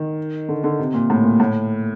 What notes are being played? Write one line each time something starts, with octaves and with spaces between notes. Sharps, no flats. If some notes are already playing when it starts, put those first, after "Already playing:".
Already playing: D#3
D3
D3
C3
A#2
A2
A#2
A2